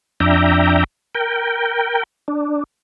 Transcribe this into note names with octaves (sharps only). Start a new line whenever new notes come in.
F2 D4 E5 G5 A#5
A#4 G5
D4